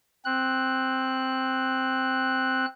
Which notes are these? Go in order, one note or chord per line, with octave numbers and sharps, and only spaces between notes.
C4 F#6